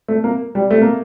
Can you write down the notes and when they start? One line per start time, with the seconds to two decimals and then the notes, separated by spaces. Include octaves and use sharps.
0.08 A3
0.24 A#3
0.55 G3
0.71 A3
0.82 A#3